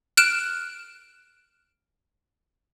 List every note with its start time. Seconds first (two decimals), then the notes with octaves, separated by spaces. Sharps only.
0.17 F6 F#6 D7 E7